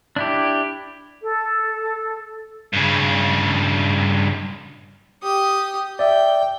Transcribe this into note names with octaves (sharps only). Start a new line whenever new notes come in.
D4 E4 G4
A4
G2 C#3
G4 D#6
D5 E5 G5